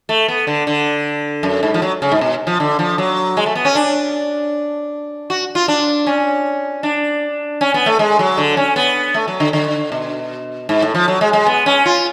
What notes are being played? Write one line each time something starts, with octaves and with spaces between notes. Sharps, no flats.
A3
B3
D3
D3
F#2
G#2
F3
F#3
C#3
G#2
B2
F3
D3
F3
F#3
G#3
A3
B3
C#4
D4
F#4
F4
D4
C#4
D4
C#4
B3
A3
G#3
F#3
D3
C#4
B3
A3
F#3
D3
D3
B2
G#2
A2
F3
F#3
G#3
G#3
B3
C#4
F4